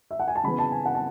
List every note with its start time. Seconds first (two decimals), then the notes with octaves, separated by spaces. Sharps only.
0.11 E5
0.20 F#5
0.28 G#5
0.35 A5
0.44 C#3 E3 B3 B5
0.58 A5
0.72 G#5
0.86 F#5
0.95 A5